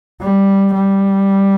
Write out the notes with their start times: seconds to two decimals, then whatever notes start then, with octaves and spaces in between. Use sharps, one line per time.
0.21 G3
0.75 G3